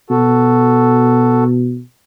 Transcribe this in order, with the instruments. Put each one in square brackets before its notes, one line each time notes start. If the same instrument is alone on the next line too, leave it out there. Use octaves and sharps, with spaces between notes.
[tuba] B2 [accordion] F#4 A4